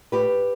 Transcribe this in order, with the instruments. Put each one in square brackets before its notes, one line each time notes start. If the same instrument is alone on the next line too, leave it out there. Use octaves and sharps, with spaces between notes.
[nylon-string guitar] A2 G4 B4